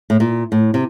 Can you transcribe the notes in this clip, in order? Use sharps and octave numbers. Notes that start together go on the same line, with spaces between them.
A2
A#2
A2
C3